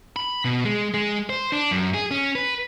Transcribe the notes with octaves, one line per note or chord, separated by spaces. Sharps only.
B5
B2
G#3
G#3
C5
D4
F#2
G#4
C#4
B4